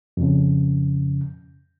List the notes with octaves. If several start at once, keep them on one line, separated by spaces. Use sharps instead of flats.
F2 C#3